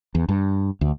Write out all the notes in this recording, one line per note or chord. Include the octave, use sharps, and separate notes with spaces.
E2
G2
D2